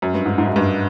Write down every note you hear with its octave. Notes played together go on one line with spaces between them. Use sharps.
F#2
G2
G#2
G#2
F#2
G2